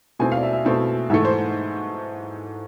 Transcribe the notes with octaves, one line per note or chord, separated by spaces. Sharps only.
B2 A3 C4 E4 G#5
F5
D5
E5
E5
B2 A3 C4 E4
G#2 E3 A3 E5
C5